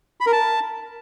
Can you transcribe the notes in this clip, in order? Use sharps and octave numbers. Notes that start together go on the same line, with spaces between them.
B5
A#4
A5